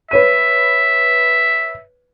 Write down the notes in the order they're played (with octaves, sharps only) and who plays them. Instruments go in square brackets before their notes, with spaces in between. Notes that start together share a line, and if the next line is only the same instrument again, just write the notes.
[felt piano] B4 C#5 D#7 [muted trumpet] E5